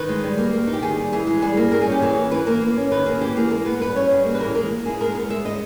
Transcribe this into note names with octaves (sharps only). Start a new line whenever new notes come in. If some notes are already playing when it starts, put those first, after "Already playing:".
Already playing: D#3 B4
G#3
G3
A#3
A#3
D#4
G4
D#3 G#4
G3
E3 G#4
G#3
G3 G#4
A#3
G3 A#4
G#4
C#4
G4
E3 G#4
A#3
E3 B4
A#3 A#4
A#3
C#4
D#3 B4
A#3 G#4
E3 G4
A#3 G#4
G#3 A#4
B3 B4
G3 B4
C#4 C#5
G3 G#4
A#3
B4
E3 A#4
G#3 A#4
A#3
E4 G#4
G#3 A#4
B3 A#4
G#3 E5
B3 D#5